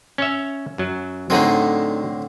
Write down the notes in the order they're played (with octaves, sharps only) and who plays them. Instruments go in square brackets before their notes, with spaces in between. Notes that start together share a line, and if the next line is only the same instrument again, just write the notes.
[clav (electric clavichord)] C#4 C#5 E5
F#2 F#3
[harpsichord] A2 D3 C4 [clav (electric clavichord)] F#3 D#4 G#4